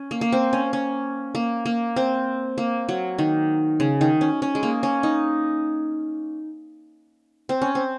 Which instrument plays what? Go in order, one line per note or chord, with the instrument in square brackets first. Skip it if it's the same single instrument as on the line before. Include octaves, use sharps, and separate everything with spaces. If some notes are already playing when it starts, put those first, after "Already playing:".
Already playing: [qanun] C#4
A#3
A#3
C4
C#4
C#4
A#3
A#3
C4
A#3
F#3
D#3
C#3
D#3
C#4
C#4
G#3
A#3
C#4
D#4
C4
C#4
C4